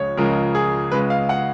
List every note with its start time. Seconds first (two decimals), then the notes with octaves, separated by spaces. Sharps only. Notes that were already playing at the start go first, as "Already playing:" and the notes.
Already playing: C#2 C#3 F3 G#3 C#5
0.17 C#2 C#3 F3 G#3 A#4
0.55 G#4
0.91 C#2 C#3 G#3 B4
1.10 F5
1.29 F#5